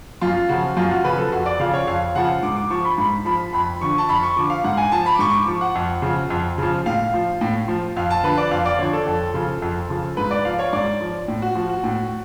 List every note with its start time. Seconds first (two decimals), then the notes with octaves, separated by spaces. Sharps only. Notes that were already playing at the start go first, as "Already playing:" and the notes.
0.21 F#2 F4
0.49 C#3 F3 F#4
0.77 F#2 F4
0.91 F#4
1.04 C#3 F3 B4
1.18 A4
1.32 F2 F#4
1.46 D5
1.60 C#3 F3 F5
1.74 C#5
1.87 F2 F5
2.15 C#3 F3 F#5
2.43 G#2 D6
2.57 D6
2.70 F3 C#6
2.85 B5
2.98 G#2 B5
3.25 F3 B5
3.53 F2 B5
3.81 D3 F3 C#6
3.98 A5
4.09 F2 B5
4.23 C#6
4.36 D3 F3 D6
4.50 F5
4.64 G#2 F#5
4.77 G#5
4.92 F3 A5
5.06 B5
5.15 D6
5.19 G#2 C#6
5.33 D6
5.47 F3 C#6
5.61 F#5
5.75 F2
6.02 C#3 F3
6.30 F2
6.58 C#3 F3
6.86 A2 F5
7.14 F3
7.41 A2
7.68 F3
7.96 F2 F5
8.10 A5
8.23 D3 F3 B4
8.38 D5
8.51 F2 F5
8.66 D5
8.79 D3 F3 C#5
8.93 A4
9.07 F2
9.34 C#3 F3
9.62 F2
9.90 C#3 F3
10.17 G#2 B4
10.31 D5
10.45 F3 F5
10.59 C#5
10.73 G#2 D5
11.01 F3
11.28 A2
11.42 F#4
11.55 F3 F#4
11.69 F#4
11.84 A2